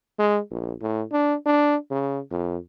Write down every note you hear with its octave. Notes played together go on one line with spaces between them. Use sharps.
G#3
A#1
A2
D4
D4
C#3
F2